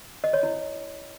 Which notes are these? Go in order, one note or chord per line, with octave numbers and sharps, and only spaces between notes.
D#5
C#5
E4